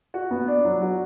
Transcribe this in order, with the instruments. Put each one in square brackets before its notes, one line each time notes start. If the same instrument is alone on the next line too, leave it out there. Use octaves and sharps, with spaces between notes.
[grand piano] F#4
B3
D4
F#3
F#4